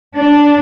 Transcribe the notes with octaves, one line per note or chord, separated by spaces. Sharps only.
D4